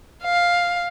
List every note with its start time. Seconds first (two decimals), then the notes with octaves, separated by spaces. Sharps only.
0.24 F5